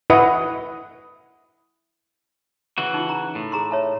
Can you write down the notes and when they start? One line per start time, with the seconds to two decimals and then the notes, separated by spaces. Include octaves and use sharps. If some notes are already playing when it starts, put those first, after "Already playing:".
0.10 E4 B4 D#5 F#5
2.78 C#3 E3 F#4
2.94 D#4 F4
3.09 A#5
3.35 A2
3.52 G#4 A#5 C6
3.71 C#5 E5 A5